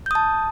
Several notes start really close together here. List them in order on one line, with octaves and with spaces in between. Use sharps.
G6 D#6 A5